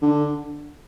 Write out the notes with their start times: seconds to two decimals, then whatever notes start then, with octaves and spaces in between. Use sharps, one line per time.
0.02 D3